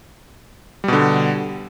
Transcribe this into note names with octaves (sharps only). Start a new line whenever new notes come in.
B2 D3 G3